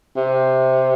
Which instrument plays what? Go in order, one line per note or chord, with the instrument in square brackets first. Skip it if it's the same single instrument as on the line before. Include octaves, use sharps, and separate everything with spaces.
[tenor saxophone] C3